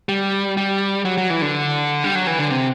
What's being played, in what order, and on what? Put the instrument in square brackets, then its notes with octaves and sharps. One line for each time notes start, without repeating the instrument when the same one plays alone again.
[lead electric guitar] G3
G3
F#3
F#3
E3
D3
G3
F#3
E3
D3
C3